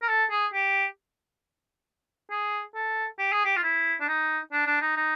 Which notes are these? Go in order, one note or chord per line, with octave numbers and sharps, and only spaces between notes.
A#4
A4
G#4
G4
G#4
A4
G4
G#4
G4
F4
E4
D4
D#4
D4
D4
D#4
D#4